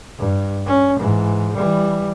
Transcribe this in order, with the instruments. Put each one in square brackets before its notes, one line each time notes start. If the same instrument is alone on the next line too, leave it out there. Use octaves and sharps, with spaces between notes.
[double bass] G2
C#4
G#2 E3
E3 G3